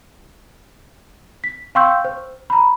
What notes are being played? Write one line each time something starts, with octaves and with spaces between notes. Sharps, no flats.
B6
F5 G5 C6 C#6 E6 G6
C5
A#5 B5